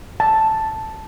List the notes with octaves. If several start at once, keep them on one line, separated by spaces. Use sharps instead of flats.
A5